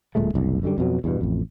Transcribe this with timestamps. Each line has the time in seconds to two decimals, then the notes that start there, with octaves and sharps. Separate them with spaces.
0.15 D1 A#2 G#3 A3
0.34 F#1 C2
0.63 F#2 D3 G3
0.78 F2 B2 F#3
1.04 E2 G2 B2
1.21 A1 F2